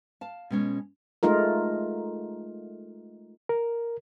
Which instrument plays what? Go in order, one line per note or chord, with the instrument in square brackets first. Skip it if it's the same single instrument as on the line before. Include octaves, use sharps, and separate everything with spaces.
[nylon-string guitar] F5 A5
B2 G#3 C#4
[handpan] G#3 A3 D#4 F4 A#4
[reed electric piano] A#4